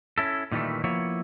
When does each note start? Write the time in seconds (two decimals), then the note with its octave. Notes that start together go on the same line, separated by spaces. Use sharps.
0.18 C#4 E4 A4
0.52 A#2 D#3 E3 G3 A3
0.84 F3 A#3 B3 E4 C#5